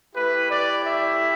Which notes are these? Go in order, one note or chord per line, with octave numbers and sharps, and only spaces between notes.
A3 E4 G4 B4
D5
E5